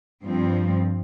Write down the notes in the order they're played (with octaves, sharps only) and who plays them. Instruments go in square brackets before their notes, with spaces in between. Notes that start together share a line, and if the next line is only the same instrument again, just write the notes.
[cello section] G2 F3 C4